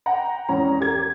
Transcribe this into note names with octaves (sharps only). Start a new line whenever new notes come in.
F#5 G5 A#5
E2 G#3 C#4 A#5
G4 A#4 G#6